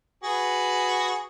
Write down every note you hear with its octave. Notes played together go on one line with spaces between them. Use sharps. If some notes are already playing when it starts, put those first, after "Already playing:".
F#4 G#4 B4